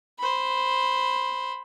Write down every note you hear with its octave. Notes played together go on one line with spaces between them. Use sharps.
C5 B5